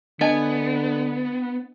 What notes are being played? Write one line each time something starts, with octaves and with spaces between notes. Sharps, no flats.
D3 B3 D4 D#5 G#5 A5